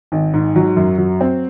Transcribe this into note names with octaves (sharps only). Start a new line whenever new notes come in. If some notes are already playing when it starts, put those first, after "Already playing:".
G#1
G#2
F#3
F#2
F#3
C4